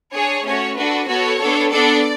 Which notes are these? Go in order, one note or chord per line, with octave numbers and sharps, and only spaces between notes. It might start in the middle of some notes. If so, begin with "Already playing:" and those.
D4 G#4 C#5
A3 C#4 F#4 C#5
D4 F#4 A4 B4
B3 F#4 A4 C#5
B3 D4 A4
B3 D4 A4 D5